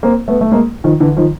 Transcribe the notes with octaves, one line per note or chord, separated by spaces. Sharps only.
A#3 C4
A3 B3
A3
G#3 A#3
D#3 F3
D3 E3
D#3 F3